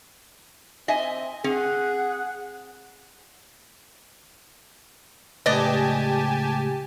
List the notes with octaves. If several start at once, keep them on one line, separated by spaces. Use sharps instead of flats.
C4 D#5 E5 G#5
C4 G#4 F#5
C#2 A2 B3 G4 D5 D#5 G#5 A5